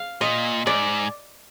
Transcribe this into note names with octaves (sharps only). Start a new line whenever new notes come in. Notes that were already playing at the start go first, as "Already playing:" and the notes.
Already playing: F5
A#2 D#5
G#2 D5